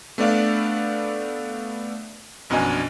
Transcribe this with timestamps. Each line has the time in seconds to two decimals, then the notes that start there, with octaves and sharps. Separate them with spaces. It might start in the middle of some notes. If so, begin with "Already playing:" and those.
0.18 A3 B3 D4 D5 E5 F5
2.50 A#1 F#2 B2 D4 D#5 G#5